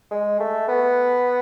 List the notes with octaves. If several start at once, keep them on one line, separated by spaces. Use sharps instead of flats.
G#3
A3
B3